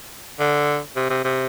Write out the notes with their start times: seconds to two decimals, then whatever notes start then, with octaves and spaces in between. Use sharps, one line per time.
0.40 D3
0.96 C3
1.10 C3
1.24 C3